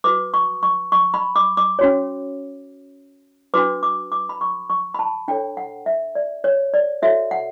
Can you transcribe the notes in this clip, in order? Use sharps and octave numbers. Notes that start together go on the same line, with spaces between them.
F#4 B4 D6
C#6
C#6
C#6
B5
D6
D6
C#4 F#4 C#5
D4 F#4 B4 D6
D6
D6
B5
C#6
C#6
B5
A5
D4 A4 C#5 G5
F#5
E5
D5
C#5
D5
F#4 A4 C#5 E5
F#5